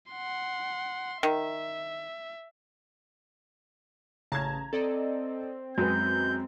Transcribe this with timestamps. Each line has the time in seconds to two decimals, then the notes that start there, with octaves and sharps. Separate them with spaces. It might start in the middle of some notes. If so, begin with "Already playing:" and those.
0.12 F#5 C6
1.23 D#3 E5
4.32 A1 C#3 A5 A#5 G#6
4.73 C4 A4 D5 D#5
5.78 F#2 G#3 C4 B4 G6